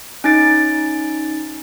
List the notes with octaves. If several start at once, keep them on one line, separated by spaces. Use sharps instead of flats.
C#4 D#4 A6 D7